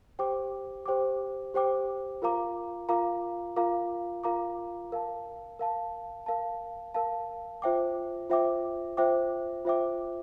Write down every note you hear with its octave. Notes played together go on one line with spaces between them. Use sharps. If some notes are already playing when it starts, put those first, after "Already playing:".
G4 C5 G5 D6
G4 C5 G5 D6
G4 C5 G5 D6
F4 A#4 F5 A#5 D6
F4 A#4 F5 A#5 D6
F4 A#4 F5 A#5 D6
F4 A#4 F5 A#5 D6
A#4 F5 A5
A#4 F5 A5
A#4 F5 A5
A#4 F5 A5
F4 C5 E5 G5 D6
F4 C5 E5 G5 D6
F4 C5 E5 G5 D6
F4 C5 E5 G5 D6